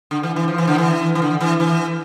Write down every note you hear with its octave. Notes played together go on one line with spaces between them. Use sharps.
D3
E3
E3
F3
E3
D3
E3
E3
D3
E3
E3